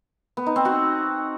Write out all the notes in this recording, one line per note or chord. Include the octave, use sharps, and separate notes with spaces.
B3
D#4
C4
F#4